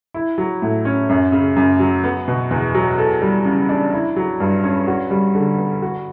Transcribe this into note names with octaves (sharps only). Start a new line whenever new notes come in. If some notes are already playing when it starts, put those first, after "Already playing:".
E4
F#3
A2
C#4
F#2
C#3
F#2
F#3
B3
B2
E2
F#3
A4
G3
C#3
D4
E4
F#3
G2
C#4
F#4
G3
D3
B3
F#4